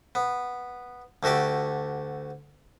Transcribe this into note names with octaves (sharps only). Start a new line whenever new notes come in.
B3
D2 A3 F#4 G4 D5